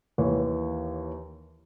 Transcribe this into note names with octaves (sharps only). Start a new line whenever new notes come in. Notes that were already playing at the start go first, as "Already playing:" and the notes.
D#2 E3 C#5